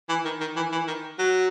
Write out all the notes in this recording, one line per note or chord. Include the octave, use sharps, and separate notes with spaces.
E3
D#3
D#3
E3
E3
D#3
F#3